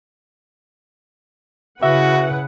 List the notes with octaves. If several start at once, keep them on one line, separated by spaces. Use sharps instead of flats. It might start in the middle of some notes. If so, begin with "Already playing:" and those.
C#3 E4 F#4 B4 E5 F#5